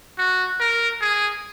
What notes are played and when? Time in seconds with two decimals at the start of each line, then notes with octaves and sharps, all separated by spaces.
0.18 F#4
0.60 A#4
1.01 G#4